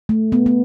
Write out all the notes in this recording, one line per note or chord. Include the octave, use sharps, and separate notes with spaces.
A3
B3
B3